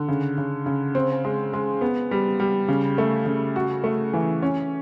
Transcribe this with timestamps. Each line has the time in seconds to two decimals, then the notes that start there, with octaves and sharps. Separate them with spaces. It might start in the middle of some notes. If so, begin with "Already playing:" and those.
Already playing: D3
0.08 C#3
0.38 C#3
0.66 C#3
0.95 C4
1.25 G#3
1.54 G#3
1.81 B3
2.11 G3
2.40 G3
2.68 C#3
2.98 A3
3.26 C#3
3.56 F#4
3.84 A3
4.14 E3
4.42 C#4